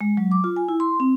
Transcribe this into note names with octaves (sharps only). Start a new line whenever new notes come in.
G#3
F#3
D6
F4
G#5
E4
C6
C4